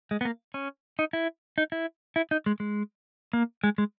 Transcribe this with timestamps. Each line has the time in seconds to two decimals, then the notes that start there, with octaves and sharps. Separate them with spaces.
0.11 G#3
0.21 B3
0.25 A#3
0.54 C#4
0.99 D#4
1.13 E4
1.58 D#4
1.72 E4
2.16 E4
2.31 D#4
2.46 G#3
2.60 G#3
3.33 A#3
3.64 G#3
3.78 G#3